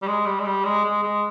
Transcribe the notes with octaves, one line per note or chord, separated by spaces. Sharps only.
G3
G#3
G3
G#3
G3
G#3
G#3
G#3